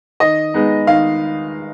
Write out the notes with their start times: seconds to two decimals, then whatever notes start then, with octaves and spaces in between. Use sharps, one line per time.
0.20 D#3 D#5
0.54 G#3 B3 D#4
0.87 D#3 F5